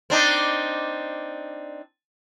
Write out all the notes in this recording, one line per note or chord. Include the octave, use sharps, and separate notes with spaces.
C4 D4 D#4